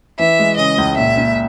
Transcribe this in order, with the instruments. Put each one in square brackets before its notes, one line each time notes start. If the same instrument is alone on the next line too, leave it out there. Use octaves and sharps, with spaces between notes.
[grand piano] E3 [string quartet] E5
[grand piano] G#3
[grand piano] C#3 [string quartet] D#5
[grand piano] C#2
[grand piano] A#2 [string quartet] E5
[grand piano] A#2